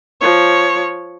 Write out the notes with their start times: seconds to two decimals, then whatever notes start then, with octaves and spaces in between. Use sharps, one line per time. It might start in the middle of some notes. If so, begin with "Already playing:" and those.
0.21 F3 C#5